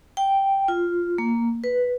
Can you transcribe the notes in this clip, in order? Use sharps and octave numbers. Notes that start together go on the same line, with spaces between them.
G5
F4
A#3
B4